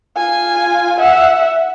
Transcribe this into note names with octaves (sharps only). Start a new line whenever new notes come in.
F4 G#5
E5 F#5